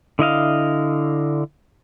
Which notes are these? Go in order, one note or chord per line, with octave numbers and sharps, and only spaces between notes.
D3 E4 D#5 F5